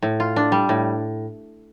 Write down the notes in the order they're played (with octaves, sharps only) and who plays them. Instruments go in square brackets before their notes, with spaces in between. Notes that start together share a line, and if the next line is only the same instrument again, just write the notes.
[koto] A2
F4
D4
G3
A2